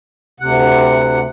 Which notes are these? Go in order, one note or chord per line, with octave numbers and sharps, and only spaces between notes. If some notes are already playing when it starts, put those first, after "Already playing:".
D2 C3 F#5